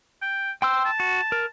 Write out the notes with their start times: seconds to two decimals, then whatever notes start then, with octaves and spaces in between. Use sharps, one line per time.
0.22 G5
0.62 C5 G5 C6 E6
0.85 A5
1.00 F#4
1.32 A#4